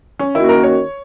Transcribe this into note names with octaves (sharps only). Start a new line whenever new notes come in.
C#4
D#3 A#3 C#4 E4 F#4
A#4
C#5